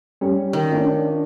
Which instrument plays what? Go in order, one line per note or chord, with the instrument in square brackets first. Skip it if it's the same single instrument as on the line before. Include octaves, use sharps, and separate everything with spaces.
[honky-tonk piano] G3 C#4
[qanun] D#3
[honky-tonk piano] C#4 D4 F4